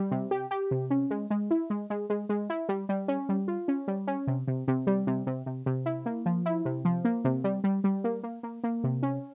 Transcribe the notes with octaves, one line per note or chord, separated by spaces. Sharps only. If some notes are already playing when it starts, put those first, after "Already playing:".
Already playing: G3
C3
G4
G4
C3
C#4
G#3
G#3
E4
G#3
G#3
G#3
G#3
E4
G3
G3
C#4
G3
F4
C#4
G3
C#4
C3
C3
C3
G3
C3
C3
C3
C3
E4
A#3
F3
E4
C3
F3
A#3
C3
G3
G3
G3
A#3
A#3
A#3
A#3
C3
C#4